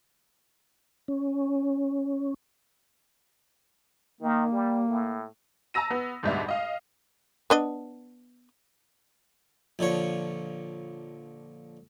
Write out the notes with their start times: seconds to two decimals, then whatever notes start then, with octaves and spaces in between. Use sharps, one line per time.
1.08 C#4
4.21 D#3 A#3
4.52 G3
4.89 A2
5.74 A5 A#5 E6 A#6 D#7
5.91 B3
6.23 D2 G#2 B2 G3 D4 E5
6.49 D#5 F5
7.50 B3 D4 D#5
9.79 A#1 D3 F3 C#5